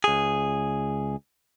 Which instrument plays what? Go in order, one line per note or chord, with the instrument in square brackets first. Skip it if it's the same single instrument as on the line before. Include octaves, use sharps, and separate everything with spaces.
[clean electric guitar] C#2 G#4